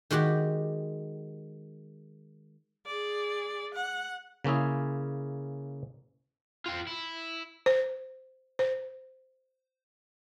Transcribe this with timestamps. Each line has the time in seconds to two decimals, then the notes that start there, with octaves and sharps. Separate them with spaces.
0.11 D#3 G#3 F#4 G4
2.86 G#4 D5
3.74 F#5
4.44 C#3 A#3 C#4 E4 G#4
6.66 F4 G5
6.87 E4
7.66 C5
8.59 C5